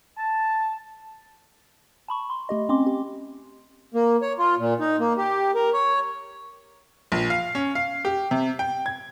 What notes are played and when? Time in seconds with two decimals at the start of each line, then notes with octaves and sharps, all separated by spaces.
0.18 A5
2.08 A5 B5 C#6
2.30 C6
2.49 A3 G4 D#5
2.69 C4 C#4 D#5 C6 D6
2.86 G4
3.94 A#3
4.22 C#5
4.39 F4
4.58 A#2
4.80 D#4
5.00 A#3
5.18 G4
5.55 A#4
5.74 C#5
7.12 A#1
7.30 F5
7.55 C#4
7.75 F5
8.05 G4
8.31 C3
8.59 G5
8.86 G#6